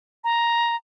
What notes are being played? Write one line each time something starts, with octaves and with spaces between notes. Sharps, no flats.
A#5